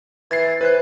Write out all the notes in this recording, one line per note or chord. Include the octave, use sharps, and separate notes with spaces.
E3 G#6 A6 C7
E3 B4 C5 F#6